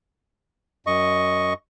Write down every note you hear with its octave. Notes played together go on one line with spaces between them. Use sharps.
F#2 D#5 C#6